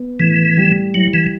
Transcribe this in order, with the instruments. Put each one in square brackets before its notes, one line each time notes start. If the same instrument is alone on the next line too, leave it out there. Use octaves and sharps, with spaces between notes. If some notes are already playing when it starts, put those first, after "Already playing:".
Already playing: [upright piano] B3
[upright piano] A2 [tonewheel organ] E3
[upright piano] G3
[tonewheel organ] F#3 [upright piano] E4
[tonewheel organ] E3